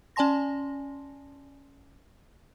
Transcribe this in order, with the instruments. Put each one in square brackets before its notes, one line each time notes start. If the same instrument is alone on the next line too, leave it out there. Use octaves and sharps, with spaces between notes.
[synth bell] C#4 D5 G#5 A5 C6 A#6